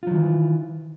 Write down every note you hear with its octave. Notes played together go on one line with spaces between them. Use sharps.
D#3 E3 F#3 F4